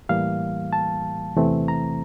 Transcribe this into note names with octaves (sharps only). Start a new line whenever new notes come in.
A2 E3 G3 A#3 F5
A5
E2 C3 E3 A3 C4
A#5